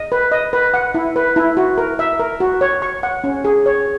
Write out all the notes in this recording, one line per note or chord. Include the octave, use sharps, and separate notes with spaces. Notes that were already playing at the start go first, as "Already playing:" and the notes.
Already playing: D#5
B4
D#5
B4
F#5
E4
B4
E4
F#4
A#4
E5
A#4
F#4
C#5
C#6
F#5
C#4
G#4
C#5